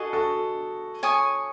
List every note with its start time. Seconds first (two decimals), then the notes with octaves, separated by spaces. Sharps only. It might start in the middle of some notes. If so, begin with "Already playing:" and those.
Already playing: F#4 G#4 A4 D#5 A5
0.13 F#4 A4
1.03 C#5 G#5 D#6